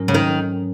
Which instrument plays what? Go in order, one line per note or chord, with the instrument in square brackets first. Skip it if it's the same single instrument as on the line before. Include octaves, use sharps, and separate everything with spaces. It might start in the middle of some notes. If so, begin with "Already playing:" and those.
Already playing: [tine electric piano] G#2 F#3 C#4 A#4
[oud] C#3
D#3